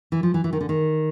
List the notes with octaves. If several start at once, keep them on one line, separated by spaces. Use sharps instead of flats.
E3
F3
E3
E3
D#3
D3
D#3